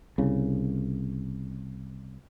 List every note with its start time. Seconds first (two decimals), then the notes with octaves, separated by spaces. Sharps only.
0.18 C2 C#3